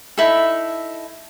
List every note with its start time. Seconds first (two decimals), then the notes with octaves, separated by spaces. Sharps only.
0.18 D#4 E4 A4